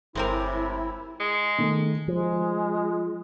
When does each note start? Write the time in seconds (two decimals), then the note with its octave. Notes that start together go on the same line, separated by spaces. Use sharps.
0.15 G1 A2 C3 G#3 C4 E4 A#4
1.20 G#3
1.58 D#3 A3
2.08 F3 G#3